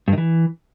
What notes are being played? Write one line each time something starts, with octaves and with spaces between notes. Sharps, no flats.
G2
D#3
E3